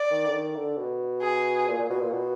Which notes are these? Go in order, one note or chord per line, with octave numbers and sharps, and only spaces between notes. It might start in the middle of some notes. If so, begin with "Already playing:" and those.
Already playing: D5
D#3
D3
D#3
D3
B2
G#4
A#2
A#2
B2
A#2
B2